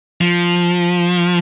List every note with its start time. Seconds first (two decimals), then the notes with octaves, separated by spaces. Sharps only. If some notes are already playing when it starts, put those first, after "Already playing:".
0.21 F3